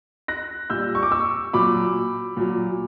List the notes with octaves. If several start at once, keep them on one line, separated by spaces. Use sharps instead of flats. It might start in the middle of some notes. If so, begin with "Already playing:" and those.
F#6 A#6
A#2 G3 E6 G6
C#6
D6
C#6 E6
A#2 F#3 B5 D6
A#2 F#3